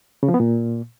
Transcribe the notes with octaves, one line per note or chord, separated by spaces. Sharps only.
C#3
F3
B3
A#2